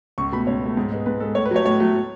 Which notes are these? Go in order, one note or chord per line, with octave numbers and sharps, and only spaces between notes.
C#2 C#6
B2 A3 B5
C#2 C#5
B2 A3
G#2
G#3 B3
G#2 B4
G#3 B3 A4
A2 C#5
B4
F#3 A3 C#5
A2 C#5
F#3 A3